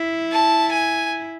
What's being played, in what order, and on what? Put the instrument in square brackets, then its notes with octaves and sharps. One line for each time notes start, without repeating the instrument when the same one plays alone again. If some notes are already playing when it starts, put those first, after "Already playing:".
Already playing: [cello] E4
[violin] A5
G#5